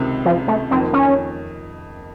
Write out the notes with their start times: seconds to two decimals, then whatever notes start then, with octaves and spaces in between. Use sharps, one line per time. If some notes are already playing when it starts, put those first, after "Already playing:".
Already playing: C#2 C3 D#3
0.26 F3
0.48 A3
0.71 F2 D#3 A#3 C4
0.93 C#4